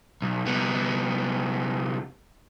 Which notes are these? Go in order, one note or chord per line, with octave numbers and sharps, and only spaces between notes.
B1
C2 B3